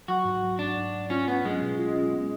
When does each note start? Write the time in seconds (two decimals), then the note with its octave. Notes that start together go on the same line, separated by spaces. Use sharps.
0.08 F#3 F#4
0.25 G#2
0.43 F#3
0.59 G#2 D4
0.76 G#2
0.94 G#2
1.10 C#4 F4
1.28 B3 C#4
1.44 F#3 G#3
1.62 B2
1.79 F4
1.96 C#4
2.13 B3